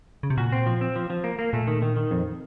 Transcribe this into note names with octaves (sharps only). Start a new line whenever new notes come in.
C#3
C3
A#2 F#4
C4
F3
C4
F3
F3
A#3
A#3
A#2 A3
D#3
D#3
D#3
F2